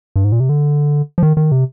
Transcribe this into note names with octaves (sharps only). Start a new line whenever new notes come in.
G2
G#2
A#2
C3
D3
F3
D#3
D#3
C3